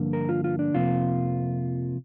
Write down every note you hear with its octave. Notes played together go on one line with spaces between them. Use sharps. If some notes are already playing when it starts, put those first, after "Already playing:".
Already playing: G2 D3 F3 A#3
A#4
F4
F4
D4
F2 C3 F3 A#3 F4